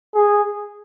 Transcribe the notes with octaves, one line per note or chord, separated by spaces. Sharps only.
G#4